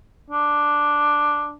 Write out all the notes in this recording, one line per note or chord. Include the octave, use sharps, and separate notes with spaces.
D4